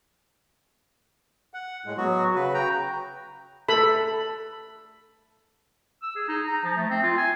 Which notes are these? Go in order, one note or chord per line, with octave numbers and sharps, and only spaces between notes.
F#5
A2 G#3
F#3 B3 F#4
C#3 F#4 B4
G5 A#5
A4 B5
E6
G#4
D#4
A#5
F3
A3
C4
F4
G#5